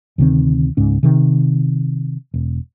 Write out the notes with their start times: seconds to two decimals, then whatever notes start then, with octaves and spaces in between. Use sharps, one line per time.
0.18 D2 C3 D#3 C4
0.77 C#2 G#2 C#4
1.03 C3 D#3
2.34 E1